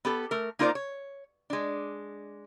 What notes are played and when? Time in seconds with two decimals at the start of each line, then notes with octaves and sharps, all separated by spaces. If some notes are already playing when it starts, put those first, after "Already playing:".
0.05 B3 G4 A4
0.31 A3 A#4
0.59 A#3 D#4 F4 A#4 C5 D5
0.75 C#5
1.50 G#3 D4